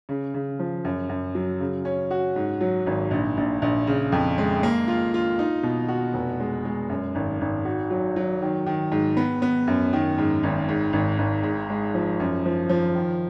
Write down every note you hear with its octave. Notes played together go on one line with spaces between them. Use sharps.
C#3
C#3
F3
F#2
F#2
F#3
C#3
C#4
F#4
G#2
F#3
G#1
A#1
A#1
A#1
C#3
F2
G#3
A#3
F4
F4
D#4
B2
F#4
F1
G#3
G#3
F#2
G#1
G#1
F#4
F#3
F#3
D#3
D#3
G#2
B3
B3
F#2
D#3
G#2
G#1
G#2
G#1
G#1
G#2
G#3
F3
F#2
F3
F3
D#3